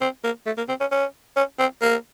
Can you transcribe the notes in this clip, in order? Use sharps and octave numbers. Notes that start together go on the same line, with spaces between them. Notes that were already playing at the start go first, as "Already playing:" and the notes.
C4
A#3
A3
A#3
C4
C#4
C#4
C#4
C4
A#3